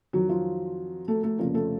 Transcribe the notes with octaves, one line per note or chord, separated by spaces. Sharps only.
F2 D#3 F#3 F#4
F3 F4
A3 A4
A3 A4
F1 F2 C#3 F3 A#3 A#4
A3 A4